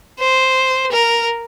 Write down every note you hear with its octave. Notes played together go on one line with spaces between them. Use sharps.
C5
A#4